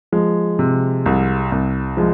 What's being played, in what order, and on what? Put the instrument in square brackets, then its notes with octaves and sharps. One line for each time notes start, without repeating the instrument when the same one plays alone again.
[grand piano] F3 G#3
C3
C2
C2
F3 G#3